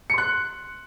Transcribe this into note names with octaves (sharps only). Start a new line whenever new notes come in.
C6 F#6 C#7